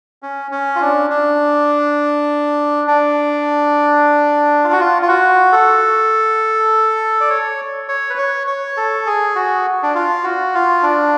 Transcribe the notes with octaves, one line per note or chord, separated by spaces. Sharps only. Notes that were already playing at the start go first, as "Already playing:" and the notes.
C#4
C#4
F4
D4
D4
D4
F4
F#4
F4
F4
F#4
A4
D5
C#5
C#5
B4
C#5
C#5
A4
G#4
F#4
D4
F4
F#4
F4
D4